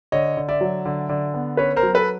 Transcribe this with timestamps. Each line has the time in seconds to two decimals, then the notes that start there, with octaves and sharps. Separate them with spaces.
0.12 D3 C#5 D#5
0.37 D3
0.49 D5 E5
0.61 F#3
0.85 D3
1.09 D3
1.34 B3
1.57 C#4 B4 C#5
1.76 A#4 C5
1.83 F#3
1.94 A4 B4